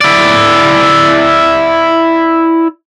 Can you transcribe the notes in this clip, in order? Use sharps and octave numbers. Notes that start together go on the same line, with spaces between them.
E4 D5